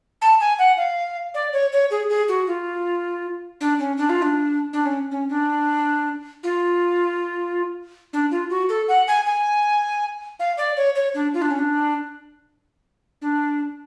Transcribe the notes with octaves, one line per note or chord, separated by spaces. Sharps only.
A5
G#5
F#5
F5
D5
C#5
C#5
G#4
G#4
F#4
F4
D4
C#4
D4
F4
D4
D4
C#4
C#4
D4
F4
D4
F4
F#4
A4
F#5
G#5
G#5
F5
D5
C#5
C#5
D4
F4
D4
C#4
D4
D4